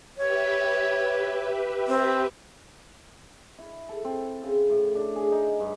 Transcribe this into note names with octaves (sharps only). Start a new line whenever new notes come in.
G4 B4 C#5 E5
C4
E4
A4
C4
C#3
A2
D4
G#4
D#4
G2